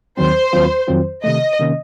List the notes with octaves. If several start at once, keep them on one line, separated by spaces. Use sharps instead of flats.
D#2 D#3 F#3 C4 C5
D#2 D#3 F#3 C4 F4
F2 D#3 F#3 C4 F4
C3 D#3 A3 D#5
C3 D#3 A#3 C#4